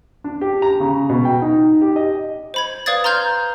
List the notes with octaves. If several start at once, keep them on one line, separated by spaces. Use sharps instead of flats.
D4
G4
A#5
C#3
B2
G5
D#4
G4
D#5
C5 B5 G#6
B4 D5 F5 D#6 G#6 A6
A#5 C6 F6 G6 G#6